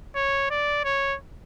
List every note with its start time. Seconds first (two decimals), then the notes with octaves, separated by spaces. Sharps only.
0.15 C#5
0.50 D5
0.85 C#5